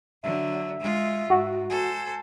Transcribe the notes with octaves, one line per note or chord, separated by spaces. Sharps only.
D3 F#3 E5
G#3 F4
G#2 F#4
A4 C5 G#5